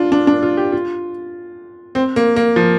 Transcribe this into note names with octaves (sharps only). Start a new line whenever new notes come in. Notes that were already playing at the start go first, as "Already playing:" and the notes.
Already playing: D4 F4
D4
D4
F4
G4
F4
C4
A#3
A#3
F3